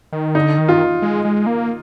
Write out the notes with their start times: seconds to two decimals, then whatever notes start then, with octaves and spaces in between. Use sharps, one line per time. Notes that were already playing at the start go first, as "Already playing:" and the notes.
0.13 D#3
0.35 D3 D#4
0.58 D#3
0.68 F4
1.02 G#3
1.25 G#3
1.46 A#3